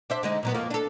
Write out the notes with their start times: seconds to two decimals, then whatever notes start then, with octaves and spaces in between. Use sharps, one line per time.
0.10 D4 C5 E5
0.23 D3 G#3 D#4
0.43 A#2 F#3 B3
0.54 F2 A#3 F4
0.71 D4 A4